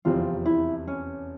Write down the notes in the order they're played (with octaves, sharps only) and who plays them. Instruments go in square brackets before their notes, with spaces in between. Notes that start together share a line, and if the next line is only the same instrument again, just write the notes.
[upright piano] F1 E2 C3 F3 C4 [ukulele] F4
[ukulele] E4
C#4